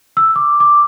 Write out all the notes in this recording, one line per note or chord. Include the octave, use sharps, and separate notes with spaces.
E6
D6
D6